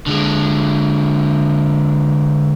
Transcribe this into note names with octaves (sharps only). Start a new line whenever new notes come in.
D3 G#3